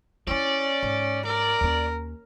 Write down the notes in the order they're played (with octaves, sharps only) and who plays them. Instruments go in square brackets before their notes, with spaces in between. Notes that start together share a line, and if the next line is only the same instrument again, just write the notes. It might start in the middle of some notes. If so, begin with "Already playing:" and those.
[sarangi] C#4 [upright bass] E4 F4 [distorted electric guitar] D5
[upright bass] G#2
[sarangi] A#4 [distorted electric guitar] D5
[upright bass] D#2 C#4